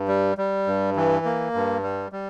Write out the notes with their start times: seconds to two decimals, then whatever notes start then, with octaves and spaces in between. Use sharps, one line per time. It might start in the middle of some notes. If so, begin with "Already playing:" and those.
Already playing: G2
0.08 G3
0.38 G3
0.67 G2
0.96 E3
1.25 A#3
1.54 G2
1.83 G3
2.12 G3